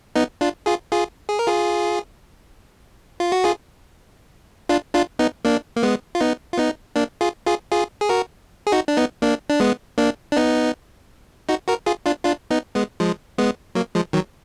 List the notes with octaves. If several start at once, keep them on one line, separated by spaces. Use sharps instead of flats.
B3 D#4
D4 F4
F4 G#4
F4 G#4
G#4
A#4
F4 G#4
F4
F#4
F4 G#4
D4 F4
D4 F4
B3 D#4
A#3 D4
A#3
G#3 B3
F4
B3 D#4
F4
B3 D#4
A#3 D4
F4 G#4
F4 G#4
F4 G#4
G#4
F#4 A#4
G#4
D#4 F#4
D4
B3 D#4
A#3 D4
D4
G#3 B3
A#3 D4
D4
B3 D#4
D#4 F#4
F#4 A#4
F4 G#4
D4 F4
D4 F4
B3 D#4
G#3 B3
F3 G#3
G#3 B3
F#3 A#3
F3 G#3
D#3 F#3